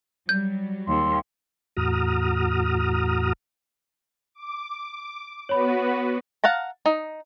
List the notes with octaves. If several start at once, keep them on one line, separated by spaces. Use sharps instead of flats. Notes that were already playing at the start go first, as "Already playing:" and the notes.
F#3 G3 G6
D#2 C6
E2 A2 F#4 A#5 D#6 F6
D6
B3 F#4 B4 C#5 B5
F5 F#5 A5 A#5
D#4